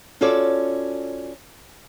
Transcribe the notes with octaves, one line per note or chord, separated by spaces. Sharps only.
C#4 F4 F#4 A4 C#5 D5